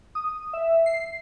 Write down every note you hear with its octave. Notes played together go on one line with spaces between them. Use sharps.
D#6
E5
C7